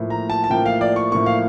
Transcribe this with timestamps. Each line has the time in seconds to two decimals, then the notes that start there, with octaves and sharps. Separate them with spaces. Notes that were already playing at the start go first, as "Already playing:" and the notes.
Already playing: A2 F3 A#3
0.10 A#5
0.30 A5
0.44 A5
0.50 A2 F3 A#3 G5
0.66 F5
0.81 D5
0.96 C#6
1.12 A2 F3 A#3 C#6
1.26 F5